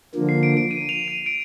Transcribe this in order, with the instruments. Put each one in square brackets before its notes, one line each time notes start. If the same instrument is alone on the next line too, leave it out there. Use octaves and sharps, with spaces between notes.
[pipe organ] D3 F3 A#3
[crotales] C7
D7
D7
D#7
F7
D#7
D7